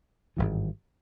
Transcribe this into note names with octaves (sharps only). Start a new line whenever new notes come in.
G#1 G2 E3